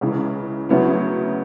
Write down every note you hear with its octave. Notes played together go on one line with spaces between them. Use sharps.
C#2 C#3 E3
D2 C#3 F#3 B3 E4